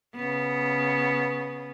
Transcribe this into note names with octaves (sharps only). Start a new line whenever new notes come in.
C#3 B3